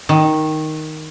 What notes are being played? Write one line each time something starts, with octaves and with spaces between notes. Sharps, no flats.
D#3